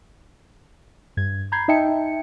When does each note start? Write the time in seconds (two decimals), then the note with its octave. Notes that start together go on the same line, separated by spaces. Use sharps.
1.17 G2 G#6
1.52 A#5 B5 G6 G#6 C7
1.68 D#4 D#5 E5 G5 A5 C#7